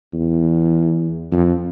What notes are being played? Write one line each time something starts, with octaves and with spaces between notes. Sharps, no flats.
E2
F2